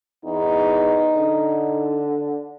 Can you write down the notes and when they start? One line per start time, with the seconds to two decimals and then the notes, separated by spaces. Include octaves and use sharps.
0.25 E2 D#4
1.15 D3